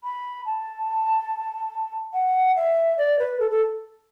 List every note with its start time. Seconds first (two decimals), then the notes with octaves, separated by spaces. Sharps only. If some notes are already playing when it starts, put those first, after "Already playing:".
0.04 B5
0.46 A5
2.14 F#5
2.56 E5
2.98 D5
3.19 B4
3.40 A4
3.51 A4